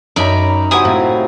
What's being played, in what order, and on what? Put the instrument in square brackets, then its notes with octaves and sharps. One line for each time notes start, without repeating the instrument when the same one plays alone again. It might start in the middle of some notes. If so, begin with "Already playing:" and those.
[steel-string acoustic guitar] F#2 C#4 [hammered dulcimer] D#4 A#5 [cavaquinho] D5 E5 B5
[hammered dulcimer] C3 F#3 C5 [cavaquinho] E4 G#5 D#6
[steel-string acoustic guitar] A2 F4